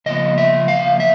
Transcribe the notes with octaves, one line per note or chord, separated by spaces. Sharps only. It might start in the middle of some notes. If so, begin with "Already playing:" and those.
C#3 F3 A#3 D#5
E5
F5
E5